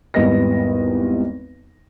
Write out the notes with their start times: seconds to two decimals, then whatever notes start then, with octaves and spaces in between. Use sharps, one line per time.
0.14 G#1 E2 G3 B3 D#5 A#6